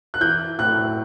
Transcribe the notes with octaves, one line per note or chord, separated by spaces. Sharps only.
F#6
E3 G6
A2 F#6